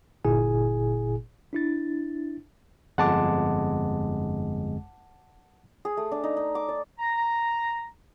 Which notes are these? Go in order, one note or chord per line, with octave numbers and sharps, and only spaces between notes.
G1 A#2 E4 G#4 G#5
D4 E4 A6
G1 F2 G#3 F#5 A5 D6
G#4
A3
D4
D#4
D#4
D6
D5
A#5